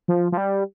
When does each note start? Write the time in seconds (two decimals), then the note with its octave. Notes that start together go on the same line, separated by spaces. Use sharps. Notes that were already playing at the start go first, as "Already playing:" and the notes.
0.08 F3
0.32 F3
0.37 G3